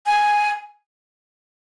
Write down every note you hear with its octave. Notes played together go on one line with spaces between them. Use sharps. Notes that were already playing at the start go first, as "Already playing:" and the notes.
G#5